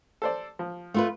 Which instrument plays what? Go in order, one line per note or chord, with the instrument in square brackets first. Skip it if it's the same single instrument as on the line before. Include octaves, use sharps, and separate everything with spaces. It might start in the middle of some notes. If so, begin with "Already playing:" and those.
[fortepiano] A4 C5 D5
F3
[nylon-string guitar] A3 F4 B4